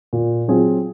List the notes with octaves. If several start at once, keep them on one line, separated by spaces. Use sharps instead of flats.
A#2
F#3 C4 F4 G#4